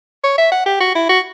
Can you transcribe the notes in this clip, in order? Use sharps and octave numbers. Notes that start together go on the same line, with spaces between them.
C#5
E5
F#5
G4
F#4
E4
F#4